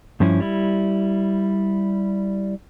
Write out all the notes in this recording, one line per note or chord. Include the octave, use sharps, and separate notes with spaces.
G2 F3 C#4 E4
G3 E4